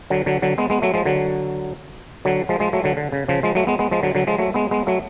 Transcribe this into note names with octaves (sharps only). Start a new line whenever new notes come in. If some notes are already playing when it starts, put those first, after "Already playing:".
D3 F#3
D3 F#3
D3 F#3
G#3 B3
G#3 B3
F#3 A3
F3 G#3
D3 F#3
D3 F#3
F3 G#3
F3 G#3
F#3 A3
D3 F#3
D3
C#3
C#3 F3
F3 G#3
F#3 A3
G#3 B3
G#3 B3
F3 G#3
D3 F#3
D3 F#3
F3 G#3
F#3 A3
G#3 B3
G#3 B3
F#3 A3